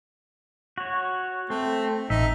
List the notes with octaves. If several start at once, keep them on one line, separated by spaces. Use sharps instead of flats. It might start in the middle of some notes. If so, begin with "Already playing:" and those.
F#4 C#5
A3 C4
A1 D#4 E5